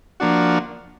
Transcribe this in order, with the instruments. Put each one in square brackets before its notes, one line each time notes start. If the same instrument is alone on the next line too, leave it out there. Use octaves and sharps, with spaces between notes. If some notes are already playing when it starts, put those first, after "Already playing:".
[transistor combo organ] F3 A#3 D4 F#4